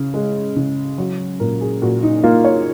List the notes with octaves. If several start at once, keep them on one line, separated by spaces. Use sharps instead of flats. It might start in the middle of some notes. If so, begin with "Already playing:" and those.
Already playing: C#3
G#3
C#3
F#3 F#4
A#2 A#4
G#4
A#2 F#4
D#4
A#3 F4
C#5